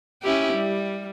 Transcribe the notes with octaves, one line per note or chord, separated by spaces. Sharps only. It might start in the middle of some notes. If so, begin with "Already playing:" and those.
C#4 E4 G4
G3